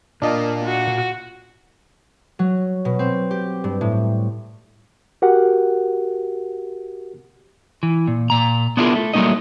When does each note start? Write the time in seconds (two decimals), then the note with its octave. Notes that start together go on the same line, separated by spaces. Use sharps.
0.22 A#2 A#3 D4 F4 D#5 A5
0.64 F#4
2.39 F#3
2.85 B2
2.99 C4
3.31 G4
3.64 G2
3.81 A2
5.22 F#4 G4 A#4 F#5
7.83 E3
8.08 A#2
8.30 A#2 A#5
8.77 B3 D4 E4 F4 G#4 A#4
8.95 A3
9.14 F#3 G3 A3 A#3 D#4 D#5